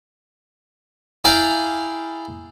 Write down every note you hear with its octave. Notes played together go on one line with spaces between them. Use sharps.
E4 G#4 D5 F5 G5 A#5